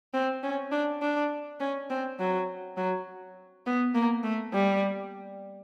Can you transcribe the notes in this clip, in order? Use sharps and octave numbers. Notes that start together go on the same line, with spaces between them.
C4
C#4
D4
D4
C#4
C4
F#3
F#3
B3
A#3
A3
G3